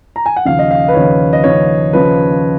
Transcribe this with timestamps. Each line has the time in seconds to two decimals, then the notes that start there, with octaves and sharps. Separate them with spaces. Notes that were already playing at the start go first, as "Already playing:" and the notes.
0.16 A#5
0.26 G#5
0.36 F#5
0.45 D#2 C#3 F3 F5
0.59 D#5
0.71 F5
0.88 B4
0.95 D#2 C#3 F3 C#5
1.33 D#5
1.44 D#2 C#3 F3 C#5
1.93 C#3 F3 B4